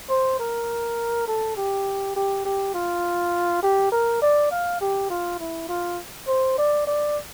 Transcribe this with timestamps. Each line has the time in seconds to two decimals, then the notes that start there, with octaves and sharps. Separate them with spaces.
0.10 C5
0.39 A#4
1.28 A4
1.57 G4
2.16 G4
2.45 G4
2.74 F4
3.63 G4
3.92 A#4
4.22 D5
4.51 F5
4.81 G4
5.10 F4
5.39 E4
5.69 F4
6.28 C5
6.58 D5
6.87 D5